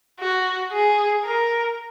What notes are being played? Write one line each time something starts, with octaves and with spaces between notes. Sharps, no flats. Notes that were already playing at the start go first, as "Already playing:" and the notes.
F#4
G#4
A#4